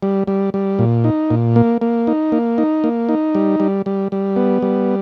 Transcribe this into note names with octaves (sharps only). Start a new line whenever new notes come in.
G3
G3
G3
A#2
D#4
A#2
A#3
A#3
D#4
A#3
D#4
A#3
D#4
G3
G3
G3
G3
B3
G3